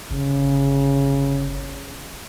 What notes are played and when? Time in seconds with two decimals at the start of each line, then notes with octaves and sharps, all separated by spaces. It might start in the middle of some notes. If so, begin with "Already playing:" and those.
0.11 G1 C#3